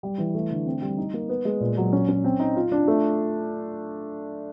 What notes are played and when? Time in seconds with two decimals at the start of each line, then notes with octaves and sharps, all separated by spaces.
0.03 G3
0.18 E3
0.35 A3
0.50 D3
0.66 C4
0.82 G3
0.98 D#4
1.14 A#3
1.29 B3
1.45 G#3
1.60 A#2
1.77 F#3
1.93 C#4
2.08 C#4
2.24 C4
2.39 D#4
2.56 F4
2.72 D4
2.88 A3